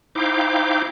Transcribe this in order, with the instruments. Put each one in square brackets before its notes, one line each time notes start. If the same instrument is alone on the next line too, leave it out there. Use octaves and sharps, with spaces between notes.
[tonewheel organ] D#4 E4 C5 F5 G5 D6